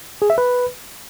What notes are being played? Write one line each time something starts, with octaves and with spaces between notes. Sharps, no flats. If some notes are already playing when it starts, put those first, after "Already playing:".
G#4
E5
B4